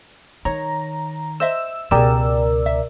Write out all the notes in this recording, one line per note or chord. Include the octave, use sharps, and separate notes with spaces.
D#3 C#5 A#5
C5 D#5 E5 E6
C#2 B2 G4 G#4 A#4 D5 E6
E5